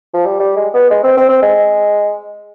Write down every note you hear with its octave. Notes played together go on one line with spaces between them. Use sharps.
F3
G3
G3
G#3
B3
G#3
C4
C4
C4
G#3